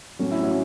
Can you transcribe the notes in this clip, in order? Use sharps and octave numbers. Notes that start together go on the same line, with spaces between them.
A2 F#3 A3 C#4
E4
C#4 F#4